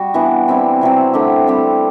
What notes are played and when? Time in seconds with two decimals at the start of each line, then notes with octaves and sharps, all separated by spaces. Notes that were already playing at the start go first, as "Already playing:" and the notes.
Already playing: G3 F#4
0.14 E3 B3 D4
0.48 G3 C4 E4
0.81 C3 F#3 C4
1.13 D3 A3 D4 G4
1.47 G3 C4 G4